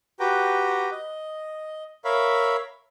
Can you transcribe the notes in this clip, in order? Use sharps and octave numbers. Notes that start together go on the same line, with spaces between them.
F#4 G4 B4 G5 A#5
D#5
A#4 C#5 E5 F5 B5